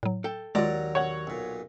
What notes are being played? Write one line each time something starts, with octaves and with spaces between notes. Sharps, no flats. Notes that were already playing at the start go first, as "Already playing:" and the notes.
A2 F#3
A4 G5
D#2 F#3 G#3 F4 D5 A#5
C#5 F#5
B1 A#2